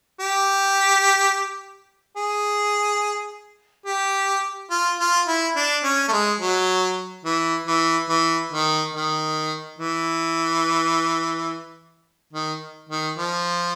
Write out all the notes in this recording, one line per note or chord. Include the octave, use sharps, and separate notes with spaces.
G4
G#4
G4
F4
F4
E4
D4
C#4
A3
G#3
F#3
E3
E3
E3
D#3
D#3
E3
D#3
D#3
F3